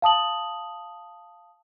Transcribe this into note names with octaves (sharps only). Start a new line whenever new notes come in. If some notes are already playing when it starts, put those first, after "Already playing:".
F5 A5 D#6 F#7